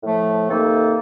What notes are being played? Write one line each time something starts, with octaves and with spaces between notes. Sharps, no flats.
A2 F3 A3
C3 D#3 A#3 D#4 A4